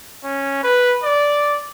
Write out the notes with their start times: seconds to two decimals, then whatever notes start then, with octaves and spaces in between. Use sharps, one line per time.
0.24 C#4
0.63 B4
1.03 D5